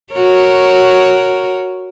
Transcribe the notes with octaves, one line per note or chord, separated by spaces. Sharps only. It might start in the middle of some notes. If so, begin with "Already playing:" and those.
F#4 A#4 C#5